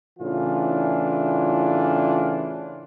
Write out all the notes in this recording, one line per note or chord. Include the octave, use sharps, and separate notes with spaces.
A2 C#3 E3 D4 F4